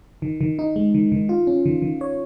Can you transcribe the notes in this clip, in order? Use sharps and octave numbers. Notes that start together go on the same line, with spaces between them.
D#3
D#3
D#4
G#3
D#3
D#3
F4
C#4
D#3
D#3
C#5